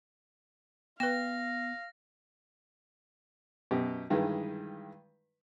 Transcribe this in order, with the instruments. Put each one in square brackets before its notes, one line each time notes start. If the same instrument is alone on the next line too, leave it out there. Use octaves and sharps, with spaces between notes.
[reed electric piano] B3 [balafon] B4 G5 [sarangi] F5 [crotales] A#6
[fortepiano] F#2 B2 G4
G2 D#3 E3 G#3